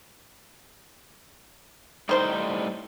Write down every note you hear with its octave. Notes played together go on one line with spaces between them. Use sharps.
A2 D#3 G3 D#4 C5 C6